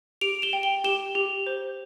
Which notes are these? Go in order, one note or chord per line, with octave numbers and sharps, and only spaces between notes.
G4 D7 F7
E7 G7
G5
G7
G4 E7 G7
G4
C5